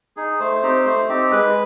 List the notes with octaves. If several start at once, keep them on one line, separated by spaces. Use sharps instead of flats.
D#4 G#4
A3 C5
C4 D#4 G4
A3
C4 D#4 G4
G#3 B4